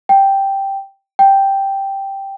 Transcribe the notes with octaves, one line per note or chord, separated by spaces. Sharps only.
G5
G5